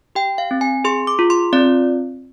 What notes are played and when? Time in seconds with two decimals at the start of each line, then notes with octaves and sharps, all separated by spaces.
0.15 G4 G5
0.38 F5
0.51 C4
0.61 G#5
0.85 G#4 C6
1.07 D6
1.19 F4
1.30 C6
1.53 C4 D5